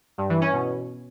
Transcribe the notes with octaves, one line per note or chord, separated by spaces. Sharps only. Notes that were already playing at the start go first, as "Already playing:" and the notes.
G2
E3
C#4
B2